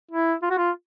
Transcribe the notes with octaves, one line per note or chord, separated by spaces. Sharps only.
E4
F4
F#4
F4